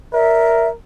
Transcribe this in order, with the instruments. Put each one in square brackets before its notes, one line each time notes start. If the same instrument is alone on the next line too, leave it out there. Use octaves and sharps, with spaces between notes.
[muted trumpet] A#4 [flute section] D5 E5